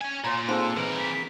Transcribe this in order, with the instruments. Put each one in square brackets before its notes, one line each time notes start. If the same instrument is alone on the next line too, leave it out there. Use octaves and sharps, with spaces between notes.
[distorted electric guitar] C#4 G#5
[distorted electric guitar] A#2 [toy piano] C#5 A#5 [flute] C6
[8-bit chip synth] C4 G#4 [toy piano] D#4 C5 C6 [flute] A4
[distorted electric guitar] E3 A#4 [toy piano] B4
[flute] B6